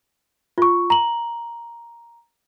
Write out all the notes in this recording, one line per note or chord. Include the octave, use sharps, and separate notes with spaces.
F4 C#6
A#5 F#7